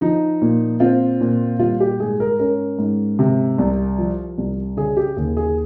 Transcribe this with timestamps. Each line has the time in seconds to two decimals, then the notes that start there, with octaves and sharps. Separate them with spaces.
0.01 F3 D#4
0.42 A#2
0.80 C4 F4
1.21 A#2
1.59 G3 F4
1.80 G4
2.00 G#2 G#4
2.20 A#4
2.39 C#4 A#4
2.79 G#2
3.19 C3
3.58 C2
3.98 F3
4.38 C2
4.77 C#3 G#4
4.97 G4
5.17 D#2 G#4
5.37 G#4